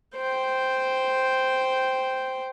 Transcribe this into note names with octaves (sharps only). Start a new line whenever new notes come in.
C5 G5